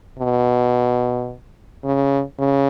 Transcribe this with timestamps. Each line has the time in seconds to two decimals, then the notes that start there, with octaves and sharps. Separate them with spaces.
0.19 B2
1.84 C#3
2.39 C#3